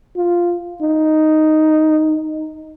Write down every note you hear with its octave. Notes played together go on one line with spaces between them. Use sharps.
F4
D#4